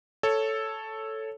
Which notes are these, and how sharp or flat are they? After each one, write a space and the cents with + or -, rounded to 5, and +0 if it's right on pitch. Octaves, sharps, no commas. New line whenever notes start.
A4 +0 C#5 +0